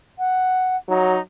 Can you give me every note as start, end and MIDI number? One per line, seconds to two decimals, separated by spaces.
0.18 0.76 78
0.88 1.17 54
0.88 1.20 63